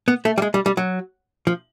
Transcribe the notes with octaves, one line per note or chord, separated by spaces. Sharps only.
B3
A3
G3
G#3
G3
G3
F#3
F3